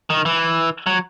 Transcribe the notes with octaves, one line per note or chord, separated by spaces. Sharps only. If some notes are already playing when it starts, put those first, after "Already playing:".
D#3
E3
F#3